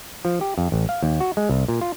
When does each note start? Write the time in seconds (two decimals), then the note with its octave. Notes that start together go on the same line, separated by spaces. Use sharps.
0.25 F3
0.41 G4
0.58 F2
0.72 A1
0.89 F5
1.03 D#2
1.21 F#4
1.37 G#3
1.49 C2
1.68 A#2
1.81 F4